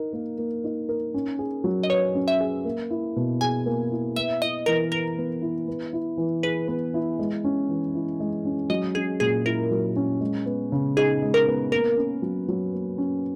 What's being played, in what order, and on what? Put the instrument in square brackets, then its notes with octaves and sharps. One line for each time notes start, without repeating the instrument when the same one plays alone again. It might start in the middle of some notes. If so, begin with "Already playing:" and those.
Already playing: [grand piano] D#4 A#4
A#3
A#3
D#4
A#4
C#4
G#4
F#3
[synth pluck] D#5
[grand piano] B4 [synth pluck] C#5
[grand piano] C#4
[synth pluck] E5
[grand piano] G#4
A#3
E4
B2
[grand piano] G#4 [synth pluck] G#5
[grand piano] A#3
E4
[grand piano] B3 [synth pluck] E5
[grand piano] E4 [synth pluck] D#5
[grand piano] E3 [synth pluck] A#4
[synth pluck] A#4 [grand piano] B4
[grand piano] B3
E4
B3
E4
E3
[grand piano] G#4 [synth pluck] B4
[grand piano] B3
E4
G#3
C#4
E3
E4
G#3
C#4
[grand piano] F#3 [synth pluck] D#5
[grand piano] C#4 [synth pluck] G#4
[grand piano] A#2 [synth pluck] G#4
[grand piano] E4 [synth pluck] A#4
[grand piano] F#3
C#4
G#3
B3
C#3
[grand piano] D#4 [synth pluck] G#4
[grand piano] G#3
[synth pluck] A#4
[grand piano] B3
[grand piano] A#3 [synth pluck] A#4
[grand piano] C#4
F#3
F#3
A#3
C#4